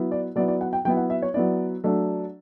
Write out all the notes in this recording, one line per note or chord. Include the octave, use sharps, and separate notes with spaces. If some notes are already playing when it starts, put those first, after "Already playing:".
Already playing: F#3 B3 E4
D5
F#3 B3 E4 D5
D5
F#5
G5
F#3 B3 E4 G5
F#5
E5
C#5
F#3 B3 E4 D5
F#3 A3 D4